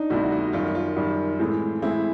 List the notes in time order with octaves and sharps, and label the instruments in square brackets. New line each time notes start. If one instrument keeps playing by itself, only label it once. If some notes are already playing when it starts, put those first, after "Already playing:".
Already playing: [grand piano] D4 D#4
[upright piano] D2 C3 E3 G3 B3 [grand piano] F#4
[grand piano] F#4
[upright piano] F#2 D#3 G3 [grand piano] F4
[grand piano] F4
[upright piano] F#2 D#3 G3
A2 E3 G#3 C4
[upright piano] A2 E3 G#3 C4 [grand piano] E4